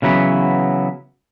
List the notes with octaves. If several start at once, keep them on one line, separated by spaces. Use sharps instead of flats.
C#3 E3 F#3 B3